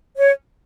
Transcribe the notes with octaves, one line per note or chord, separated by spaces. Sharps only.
C#5